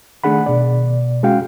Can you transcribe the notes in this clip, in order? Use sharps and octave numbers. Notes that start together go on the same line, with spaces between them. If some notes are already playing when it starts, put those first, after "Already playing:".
D#3 A3 D4 G#4 F#5 B5
B2 D5
G#3 C#4 F#4 F5 G5